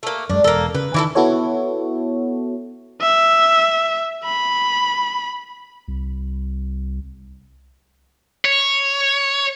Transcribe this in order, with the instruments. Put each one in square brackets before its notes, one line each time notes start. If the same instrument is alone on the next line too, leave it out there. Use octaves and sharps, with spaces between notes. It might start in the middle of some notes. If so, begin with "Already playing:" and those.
[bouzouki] A3 A#3
[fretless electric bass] F#2 G#3 [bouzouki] D4
[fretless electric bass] E1 [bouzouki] A#3 A4
[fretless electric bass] C#3 [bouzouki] B4
[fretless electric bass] D#3 [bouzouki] E3 E4 A4
[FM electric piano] B3 E4 F#4 A4 C#5
[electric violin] E5
B5
[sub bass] C2
[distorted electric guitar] C#5